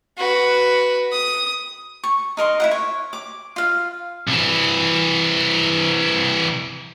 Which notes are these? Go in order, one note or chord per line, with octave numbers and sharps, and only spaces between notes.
F#4 B4
D#6
C#6
D#4 A#4 D#5 C6
E4 F4 F#5
C#5
D6
F4 F5
C2 E3